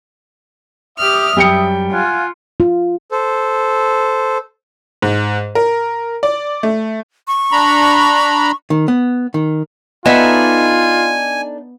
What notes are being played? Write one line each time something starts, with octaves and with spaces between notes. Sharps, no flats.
G4 E5 D#6 F6
F#2 G3 G5 C#7
F4 F5 F#5 G#5
F4
A4 C5
G#2
A#4
D5
A3
C#6
D4 A#5 B5
D#3
B3
D#3
B3 D4 D#4 F4 A4 E5 G#5